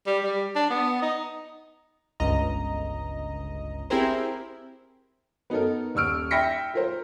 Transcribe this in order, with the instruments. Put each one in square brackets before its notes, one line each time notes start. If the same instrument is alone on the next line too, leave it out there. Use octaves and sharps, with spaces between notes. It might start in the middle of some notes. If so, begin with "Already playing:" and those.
[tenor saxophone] G3
G3
D4
B3
D#4
[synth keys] G1 C#2 D#5 A#5
C4 E4 G4 G#4 A#4 C5
[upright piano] B3 D#4 F#4 A4 A#4
D#1 C#6 E6 F6 D7
E5 G5 B5 A#6 B6 C#7
F4 A#4 C5